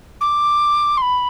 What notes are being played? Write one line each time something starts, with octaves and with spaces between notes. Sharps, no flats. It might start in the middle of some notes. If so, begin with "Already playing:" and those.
D6
C6
B5